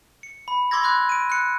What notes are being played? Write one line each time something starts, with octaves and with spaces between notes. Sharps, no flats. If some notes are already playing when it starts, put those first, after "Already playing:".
C#7
B5
C6 D6 E6 G#6 A#6
B5 D6 F#6 G#6
D7 D#7
F#6 C#7